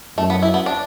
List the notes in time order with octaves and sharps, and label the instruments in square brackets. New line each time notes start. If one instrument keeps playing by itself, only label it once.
[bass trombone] F#2 [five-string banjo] A3
[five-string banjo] B3
E4
B3
D4